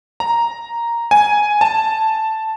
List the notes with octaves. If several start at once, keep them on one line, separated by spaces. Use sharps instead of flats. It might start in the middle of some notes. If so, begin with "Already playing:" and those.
A#5
G#5
A5